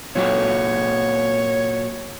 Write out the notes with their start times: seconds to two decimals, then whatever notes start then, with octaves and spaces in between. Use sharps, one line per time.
0.15 A#2 F#3 F#4 C#5